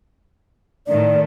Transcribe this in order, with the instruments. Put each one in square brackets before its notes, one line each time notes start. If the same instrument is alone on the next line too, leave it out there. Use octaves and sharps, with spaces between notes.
[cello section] A2 D#3 A3 [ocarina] D5